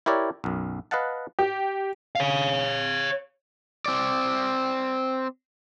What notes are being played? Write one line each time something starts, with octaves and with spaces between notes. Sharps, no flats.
E4 G4 A#4 C#5 D5
B1 F#2
B4 D#5 F5 F#5 A5
G4
C#5 F5
C4 D5